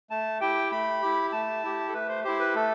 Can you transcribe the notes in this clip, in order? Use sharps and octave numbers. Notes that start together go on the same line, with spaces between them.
A3 A5
E4 G4 G5
A3 B5
E4 G4
A3 A5
E4 G4
A4
A3 B4
C5
E4 G4 C5
B4
A3 A4